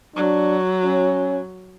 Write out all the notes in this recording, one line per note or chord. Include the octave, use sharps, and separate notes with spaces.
F#3 D4
C#4